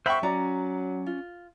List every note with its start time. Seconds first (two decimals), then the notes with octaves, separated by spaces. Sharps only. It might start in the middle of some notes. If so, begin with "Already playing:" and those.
0.06 C5 E5 F#5 G5 B5 C#6
0.23 F#3 C#4 F#4 D5 A#5
1.06 F4